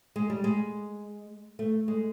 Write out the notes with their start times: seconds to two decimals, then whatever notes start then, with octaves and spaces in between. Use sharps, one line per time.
0.16 G#3
0.30 G3
0.44 G#3
1.59 A3
1.88 G#3